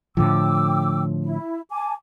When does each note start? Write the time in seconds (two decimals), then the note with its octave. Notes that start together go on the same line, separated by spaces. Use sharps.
0.17 A2 D3 F3 G5 D6 E6
1.23 E4
1.70 G#5 A5 D6